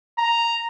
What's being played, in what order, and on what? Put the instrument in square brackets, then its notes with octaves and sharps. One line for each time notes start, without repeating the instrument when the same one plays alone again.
[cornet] A#5